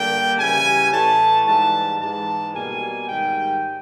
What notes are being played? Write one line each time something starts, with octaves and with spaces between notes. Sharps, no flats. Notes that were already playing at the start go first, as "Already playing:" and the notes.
Already playing: G2 D3 G3 A#3 G5
C#3 E3 G3 G#5
A2 E3 A3 A5
G#2 E3 G3 A5
G#2 E3 G#3 A5
B2 G3 A#3 G#5
G#2 D#3 G3 G5